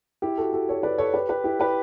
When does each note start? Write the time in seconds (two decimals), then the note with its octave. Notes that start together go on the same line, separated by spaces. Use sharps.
0.22 E4 G4
0.37 F#4 A4
0.53 F#4 A4
0.69 A4 C#5
0.83 B4 D5
0.98 A4 C#5
1.14 G4 B4
1.29 G4 B4
1.44 E4 G4
1.60 G4 B4